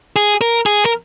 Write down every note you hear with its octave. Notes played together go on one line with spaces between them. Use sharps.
G#4
A#4
G#4
A#4